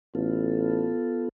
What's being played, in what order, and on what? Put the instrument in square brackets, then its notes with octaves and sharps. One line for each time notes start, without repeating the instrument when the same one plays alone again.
[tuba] A1 [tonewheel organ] B3 F4 A4